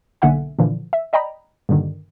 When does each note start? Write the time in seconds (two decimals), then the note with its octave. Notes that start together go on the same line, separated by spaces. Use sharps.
0.22 B1 D3 A#3 E5 F#5 G#5
0.59 A#2 D3 E3 F3
0.93 E5
1.13 D5 D#5 G5 A#5 B5
1.69 G2 A#2 D3 D#3